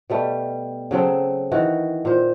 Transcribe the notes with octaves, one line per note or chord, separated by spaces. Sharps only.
B2 G3 A3
C#3 F#3 C4 A4
D#3 E3 F#4
A#2 C5